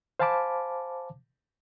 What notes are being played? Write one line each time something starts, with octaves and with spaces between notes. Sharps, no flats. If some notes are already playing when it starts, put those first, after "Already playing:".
C5 F5 G#5 A5 B5 D6